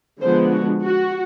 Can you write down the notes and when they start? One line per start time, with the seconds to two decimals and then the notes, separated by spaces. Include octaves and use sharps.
0.21 D3 F3 G#3 B3 D4 C5
0.52 F#4
0.83 F#4